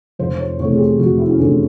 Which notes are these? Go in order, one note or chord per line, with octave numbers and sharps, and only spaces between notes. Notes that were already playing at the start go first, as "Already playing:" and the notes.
F1 C5
C#5
E2 C3 E3 A3 C#5
G#4
G4
F1 F#4
E4
C#4
E2 C3 E3 A3 D4